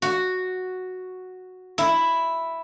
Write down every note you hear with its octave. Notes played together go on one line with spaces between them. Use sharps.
F#4
E4